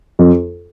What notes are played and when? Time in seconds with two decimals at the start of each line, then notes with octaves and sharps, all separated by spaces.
0.19 F2